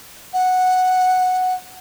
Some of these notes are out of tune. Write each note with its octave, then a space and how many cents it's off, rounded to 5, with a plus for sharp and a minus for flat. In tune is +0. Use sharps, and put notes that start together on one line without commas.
F#5 -5